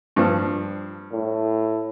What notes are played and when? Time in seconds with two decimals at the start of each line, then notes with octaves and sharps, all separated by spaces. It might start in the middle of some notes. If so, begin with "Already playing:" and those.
0.16 G2 F3
1.12 A2